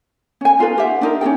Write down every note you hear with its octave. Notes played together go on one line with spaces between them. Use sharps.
C#4 G#5
D#4 F4 A4 B4
G4 E5 F#5
D4 D#4 A#4
C#4 G4 G#4 G5